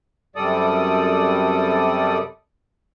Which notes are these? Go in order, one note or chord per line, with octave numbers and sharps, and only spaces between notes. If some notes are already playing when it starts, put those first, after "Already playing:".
F#2 C3 G3 A4 D5 D#6